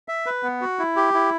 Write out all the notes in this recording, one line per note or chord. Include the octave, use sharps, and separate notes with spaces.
E5
B4
B3
F#4
E4
G4
E4